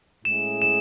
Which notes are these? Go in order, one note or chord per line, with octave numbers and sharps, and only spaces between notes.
A2 G#3 C#4 E4 G#4 E7
E7